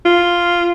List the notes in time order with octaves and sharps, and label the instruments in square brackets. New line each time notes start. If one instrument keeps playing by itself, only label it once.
[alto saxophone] F4